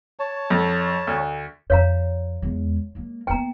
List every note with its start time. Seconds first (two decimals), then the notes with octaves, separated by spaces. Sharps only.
0.19 C#5 A5
0.50 F2
1.07 D2
1.70 F2 C#5 F5 A#5
2.42 E2 G#3
2.95 G#3 A#3
3.27 A#3 B3 G5 A#5